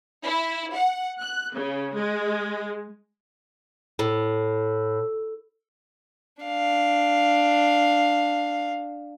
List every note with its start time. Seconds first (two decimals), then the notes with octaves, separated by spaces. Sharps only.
0.23 E4
0.73 F#5
1.20 F#6
1.55 C#3
1.95 G#3
3.99 A2
6.42 D4 F5